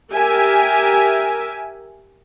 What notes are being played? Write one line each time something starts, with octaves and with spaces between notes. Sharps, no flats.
G4 A#4 E5 G#5